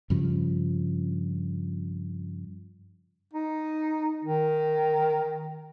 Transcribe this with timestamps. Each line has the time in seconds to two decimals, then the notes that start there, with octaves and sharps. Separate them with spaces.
0.10 G2 C#3 F3
3.33 D#4
4.24 D#3